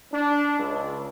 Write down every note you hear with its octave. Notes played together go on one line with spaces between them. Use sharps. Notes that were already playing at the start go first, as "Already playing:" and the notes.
D4
C#2